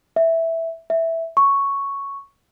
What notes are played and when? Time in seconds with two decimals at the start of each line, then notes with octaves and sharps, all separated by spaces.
0.16 E5
0.90 E5
1.37 C#6